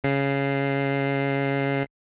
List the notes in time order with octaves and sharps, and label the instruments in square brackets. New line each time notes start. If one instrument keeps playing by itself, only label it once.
[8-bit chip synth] C#3 C7